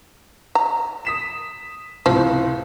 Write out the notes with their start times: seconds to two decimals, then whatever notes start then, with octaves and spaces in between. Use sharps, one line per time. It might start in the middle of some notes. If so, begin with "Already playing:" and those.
0.55 A#5
1.05 D#6 B6 E7
2.06 C#2 A2 C3 F3